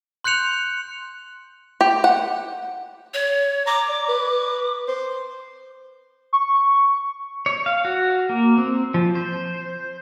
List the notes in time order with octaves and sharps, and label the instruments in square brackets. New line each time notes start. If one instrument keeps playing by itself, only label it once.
[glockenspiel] C6 F#6 G6 C#7 F7
[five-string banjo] G4
F#5
[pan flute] C#5
[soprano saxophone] A#5 [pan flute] D6
[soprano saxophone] D5
B4
C5
[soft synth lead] C#6
[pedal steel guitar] C#5
F5
F#4
A#3
C4
F3
C5